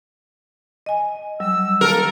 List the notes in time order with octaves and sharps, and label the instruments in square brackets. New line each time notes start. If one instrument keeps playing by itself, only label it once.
[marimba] D#5 G#5
[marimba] F#3 G3 [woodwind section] E6
[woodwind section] A#3 A4 [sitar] A#4